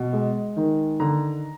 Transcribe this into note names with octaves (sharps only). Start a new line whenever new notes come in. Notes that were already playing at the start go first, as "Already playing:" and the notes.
Already playing: B2
G#3
D#3
D3 A#5